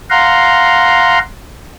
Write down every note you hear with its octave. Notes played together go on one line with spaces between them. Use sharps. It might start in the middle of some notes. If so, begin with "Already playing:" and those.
F5 F#5 A#5 C6